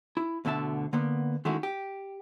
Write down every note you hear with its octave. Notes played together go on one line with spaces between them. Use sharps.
E4
D2 B2 D3 E5 A5
D3 A#3 B3
D#3 G#3 A3 C#4 E4 F#4
G4